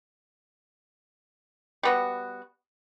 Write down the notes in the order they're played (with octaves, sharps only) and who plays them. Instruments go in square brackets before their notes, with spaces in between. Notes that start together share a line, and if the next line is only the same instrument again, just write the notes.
[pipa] G3 B3 F#4